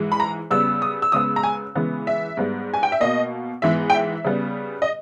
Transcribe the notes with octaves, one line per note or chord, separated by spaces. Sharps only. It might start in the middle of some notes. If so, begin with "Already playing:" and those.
Already playing: G#2 E3 G#3
B5
A#5
C#3 G3 B3 E6
D#6
E6
C#3 G#3 B3 D#6
A#5
G#5
C#3 E3 G#3 B3
E5
G#2 G3 B3
G#5
G5
E5
B2 A#3 D#5
G#2 E3 G#3 B3 E5
G5
E5
C#3 G3 B3
D#5